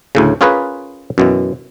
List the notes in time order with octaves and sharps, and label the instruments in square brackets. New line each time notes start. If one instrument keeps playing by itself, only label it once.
[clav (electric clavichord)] D2 A2 C#3
C#4 F4 G#4 A#4 B4
F#2 B2 E3